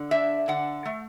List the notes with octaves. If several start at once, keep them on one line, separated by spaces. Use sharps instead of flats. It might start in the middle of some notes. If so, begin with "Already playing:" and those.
Already playing: D3
D4 E5
D3 F#5
A3